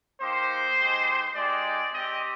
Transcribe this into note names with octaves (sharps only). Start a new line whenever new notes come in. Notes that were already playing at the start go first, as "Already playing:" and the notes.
A#3 D#4 G4 C5
G#3 D#4 G4
G#3 D#4 G4 D5
C4 G4 D#5